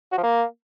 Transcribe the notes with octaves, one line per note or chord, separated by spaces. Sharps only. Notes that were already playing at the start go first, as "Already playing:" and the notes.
F#4
F3
A#3